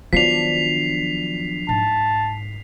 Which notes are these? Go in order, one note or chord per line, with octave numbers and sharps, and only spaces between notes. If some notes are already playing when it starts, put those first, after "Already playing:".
D#3 F3 F#3 B3 D4 B6 C7 F7
G#2 A5